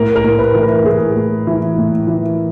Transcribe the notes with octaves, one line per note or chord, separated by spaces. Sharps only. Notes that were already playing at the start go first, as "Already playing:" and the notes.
Already playing: A2 A#4
A#4
A2
B4
E3
A#4
A2 G#4
A2
E3
A2
E3